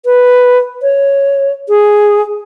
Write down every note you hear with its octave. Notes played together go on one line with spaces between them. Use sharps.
B4
C#5
G#4